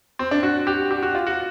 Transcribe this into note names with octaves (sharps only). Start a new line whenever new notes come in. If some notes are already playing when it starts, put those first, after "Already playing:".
C4
D4
F#4
G4
G4
F#4
F4
F#4